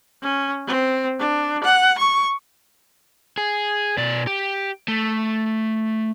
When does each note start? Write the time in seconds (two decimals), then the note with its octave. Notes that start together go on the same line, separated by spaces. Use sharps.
0.22 C#4
0.67 C4
1.20 D4
1.63 F#5
1.98 C#6
3.38 G#4
3.98 B2 D5
4.27 G4
4.88 A3